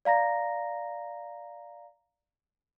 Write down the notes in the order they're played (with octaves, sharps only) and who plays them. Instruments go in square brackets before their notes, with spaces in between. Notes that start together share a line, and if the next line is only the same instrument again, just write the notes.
[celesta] D5 F5 A#5 A#6